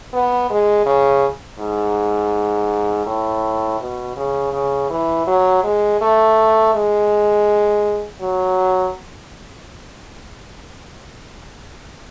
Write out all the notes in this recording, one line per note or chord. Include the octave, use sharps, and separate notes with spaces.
B3
G#3
C#3
G#2
A2
B2
C#3
C#3
E3
F#3
G#3
A3
G#3
F#3